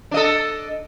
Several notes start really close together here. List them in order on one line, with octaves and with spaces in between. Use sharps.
D4 D#5 A4